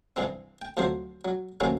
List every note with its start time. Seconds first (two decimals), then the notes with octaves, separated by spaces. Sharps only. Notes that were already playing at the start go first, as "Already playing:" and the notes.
0.16 C2 G2 C3 E3 C4
0.62 G5
0.77 D2 C3 F3 F#3 C5
1.25 F#3
1.60 D2 C3 F#3 A#3 C4 C#4